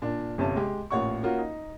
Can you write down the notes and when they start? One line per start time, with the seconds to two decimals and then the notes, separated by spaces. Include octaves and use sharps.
0.02 A#2 D4
0.38 G1 C3 C#4 A5
0.56 G#3 G4
0.90 A1 A#2 C#5 F#5 C#6
1.23 A#3 C#4 F4 F#4 A#4
1.39 D#4